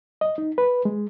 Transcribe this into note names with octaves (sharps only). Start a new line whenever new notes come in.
D#5
D#4
B4
G#3